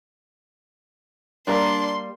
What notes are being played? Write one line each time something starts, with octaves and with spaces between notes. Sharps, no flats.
G3 A#3 D4 A#4 C6